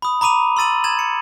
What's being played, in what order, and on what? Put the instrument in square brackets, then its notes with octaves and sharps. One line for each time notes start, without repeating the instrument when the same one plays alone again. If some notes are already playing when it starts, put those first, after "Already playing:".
[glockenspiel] B5 D#6
A#5 B5 D6 D#7 F7
C6 E6 A6 D#7 F#7
G#6 A6 E7 F#7
C#7